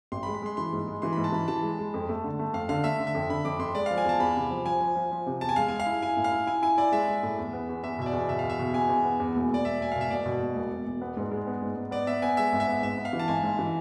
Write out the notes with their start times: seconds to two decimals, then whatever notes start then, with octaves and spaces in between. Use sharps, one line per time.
0.12 A1 C6
0.23 B5
0.27 G#3
0.34 B5
0.42 G#3 C6
0.57 E3 C6
0.73 G#2
0.88 G#3
1.02 E3 C6
1.13 G#2 B5
1.24 A5
1.32 E3 B5
1.48 E3 A5
1.62 G#3
1.79 G#3
1.94 F2
2.09 A3
2.24 D3
2.39 A3
2.53 F2 F5
2.69 D3 F5
2.84 A3 E5
3.00 D3
3.07 E5
3.15 F2
3.30 D3 B5
3.45 F2 D6
3.59 F2 C6
3.75 G#3 D5
3.86 F3 F5
3.98 G#5
4.05 E2 A5
4.20 E2 B5
4.36 C3
4.51 F3
4.65 F3 G#5
4.81 F3
4.96 F3
5.12 F3
5.26 C3
5.41 E2 A5
5.49 G#5
5.56 G#3 F5
5.68 G#3 G#5
5.80 F5
5.86 E4
6.02 E4 G#5
6.17 A2
6.24 F5
6.32 E4
6.47 E4 G#5
6.62 E4 G#5
6.77 E4 D5
6.92 G#3 E5
7.08 G#3
7.23 A2
7.39 E2
7.53 B3
7.69 E2
7.83 E2 E5
7.99 B2 E5
8.06 D5
8.13 E2
8.29 B2 E5
8.39 E2 F5
8.50 E5
8.59 B2
8.74 E2 G#5
8.89 E2
9.05 B3
9.20 E2
9.35 E1
9.50 E1 D5
9.65 E1 E5
9.80 E1 G#5
9.92 B2 F5
10.01 E5
10.10 E1 D5
10.26 B2
10.41 E1
10.56 E1
10.71 E1
10.86 E1
11.01 B3
11.17 G#2
11.31 G#3
11.47 B3
11.62 G#2
11.76 G#2
11.91 B3 D5
12.07 B3 E5
12.22 B3 G#5
12.37 G#3 E5
12.53 G#1
12.60 E5
12.67 B3
12.82 G#2 E5
12.98 B3
13.05 F5
13.13 E3
13.19 A5
13.28 G#1 G#5
13.43 G#2
13.59 E3